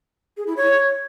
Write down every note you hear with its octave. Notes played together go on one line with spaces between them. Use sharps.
G#4
E4
C#5